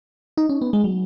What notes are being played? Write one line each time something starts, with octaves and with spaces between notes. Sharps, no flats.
D#4
C#4
B3
G#3
F#3